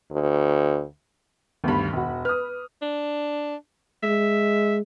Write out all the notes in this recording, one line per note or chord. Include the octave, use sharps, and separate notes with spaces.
D2
D2 G2 D#3 B3 B5
E1 F#4
B4 D#6 F6
D4
G#3 E5